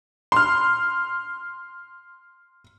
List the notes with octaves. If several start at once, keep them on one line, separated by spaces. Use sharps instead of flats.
C6 F6